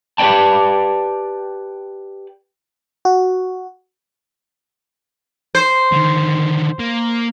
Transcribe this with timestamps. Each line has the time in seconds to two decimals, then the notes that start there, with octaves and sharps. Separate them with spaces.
0.18 G4 B4 C5 D5 G5 A5
3.05 F#4
5.55 C5
5.92 D3 D#3
6.79 A#3